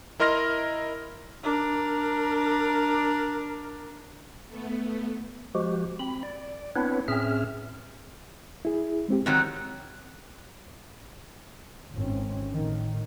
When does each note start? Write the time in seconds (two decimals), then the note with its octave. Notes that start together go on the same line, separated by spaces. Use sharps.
0.20 E4 A#4 D#5 C6 F6 A#6
1.43 D4 A#4
4.48 A3 B3
5.55 F3 G#3 F#4 G4
5.99 C4 B5
6.23 D5
6.76 B3 C4 D4 E4 B4 C#5
7.08 A2 C4 C#4 G#4 E5 F6
8.65 E4 G#4
9.08 G#3 C4 G4
9.26 G#2 D#3 F#3 C4
11.93 G#1 C4 C#4
12.51 A2 D#3